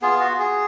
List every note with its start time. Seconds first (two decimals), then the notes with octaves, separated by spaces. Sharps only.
0.02 B3 F4 G#4
0.20 F#4
0.39 G#4